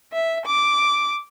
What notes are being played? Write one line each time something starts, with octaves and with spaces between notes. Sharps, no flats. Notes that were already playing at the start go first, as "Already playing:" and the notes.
E5
D6